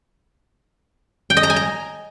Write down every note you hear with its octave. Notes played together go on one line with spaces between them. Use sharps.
G5
D#5
A#5
G#5
A#5